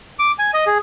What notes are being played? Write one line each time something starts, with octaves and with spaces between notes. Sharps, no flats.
D6
G#5
D#5
G#4